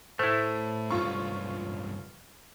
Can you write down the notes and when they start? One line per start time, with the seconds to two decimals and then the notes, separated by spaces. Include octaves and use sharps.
0.19 A2 A3 E4 C5
0.91 C#2 G2 F4 C#6